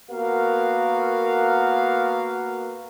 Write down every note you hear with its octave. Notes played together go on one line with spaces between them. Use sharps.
A#3 B3 F#4 A#4 F5